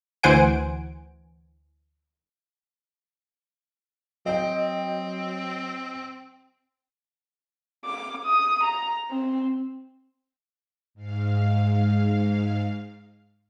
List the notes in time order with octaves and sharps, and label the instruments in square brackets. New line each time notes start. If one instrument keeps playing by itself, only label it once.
[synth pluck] D2 E3 C5 F#5 G#5 D7
[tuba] F#3 [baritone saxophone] C4 [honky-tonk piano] D#5 G5
[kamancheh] D6
D#6
A#5
C4
[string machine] G#2 F5